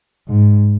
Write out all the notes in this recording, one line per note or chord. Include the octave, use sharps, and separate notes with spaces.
G#2